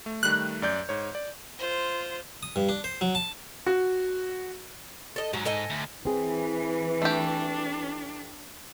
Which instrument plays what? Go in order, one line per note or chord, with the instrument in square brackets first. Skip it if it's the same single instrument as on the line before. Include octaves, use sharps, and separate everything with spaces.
[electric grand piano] A3
[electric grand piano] D#3 G3 A3 [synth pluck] F#6
[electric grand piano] F#2 D5 G6
G#2 C#5
D5
[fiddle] F4 C5
[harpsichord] D#6
G2
D4
C5
F#3
A5
[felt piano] F#4
[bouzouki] A4 D#5
[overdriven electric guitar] G#2 [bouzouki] F#3
[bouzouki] A4 D#5 G#5
[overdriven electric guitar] D2
[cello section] E3 [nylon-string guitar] C4 G#4
[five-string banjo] A3 G4 [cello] D4